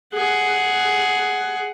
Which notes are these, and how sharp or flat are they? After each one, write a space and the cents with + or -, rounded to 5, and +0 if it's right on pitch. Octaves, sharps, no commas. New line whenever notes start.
G#4 +10 F#5 +10